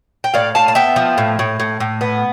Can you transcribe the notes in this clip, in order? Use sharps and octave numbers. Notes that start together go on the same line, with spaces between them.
G5
A2 D5 F5
A2 F5 A5
A5
B3 E5 G5
F3
A2
A2
A2
A2
B3